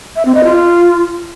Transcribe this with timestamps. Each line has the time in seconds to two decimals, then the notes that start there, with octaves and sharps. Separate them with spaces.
0.16 E5
0.25 C4
0.35 D#5
0.44 F4